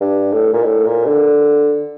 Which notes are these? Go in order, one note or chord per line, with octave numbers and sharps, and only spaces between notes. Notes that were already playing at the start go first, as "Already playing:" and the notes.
G2
A2
A#2
A2
A#2
D3